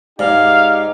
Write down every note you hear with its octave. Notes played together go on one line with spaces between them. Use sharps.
G#2 D#4 G4 D5 F5